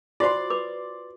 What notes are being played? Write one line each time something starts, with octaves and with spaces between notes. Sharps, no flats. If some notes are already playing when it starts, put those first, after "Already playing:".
F4 F#4 C5 D5 C6
B4 D6